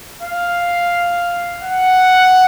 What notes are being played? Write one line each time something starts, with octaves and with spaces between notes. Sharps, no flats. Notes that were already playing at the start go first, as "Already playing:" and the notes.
F5
F#5